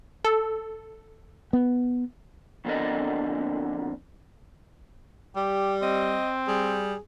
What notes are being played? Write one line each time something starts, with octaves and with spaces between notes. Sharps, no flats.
A4
B3
F2 B2 D3 D4 A#4 D#5
G3 G4
C4 D#5
G3 G#4